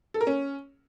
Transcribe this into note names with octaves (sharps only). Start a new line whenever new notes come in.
A4
A#4
C#4